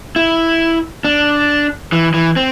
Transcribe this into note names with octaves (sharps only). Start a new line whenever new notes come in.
E4
D4
E3
E3
C4